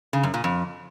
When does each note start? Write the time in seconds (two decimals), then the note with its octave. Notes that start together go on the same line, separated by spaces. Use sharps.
0.13 C#3
0.23 F#2
0.34 A#2
0.44 F2